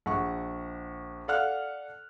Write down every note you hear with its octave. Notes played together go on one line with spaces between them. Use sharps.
A#1 F#5 C#6
A4 D5 F5 F#5 F6 F#6